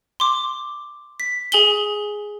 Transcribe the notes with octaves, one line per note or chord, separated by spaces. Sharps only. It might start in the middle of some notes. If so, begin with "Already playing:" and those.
C6 D6
B6
G#4 G#5 F#7 G7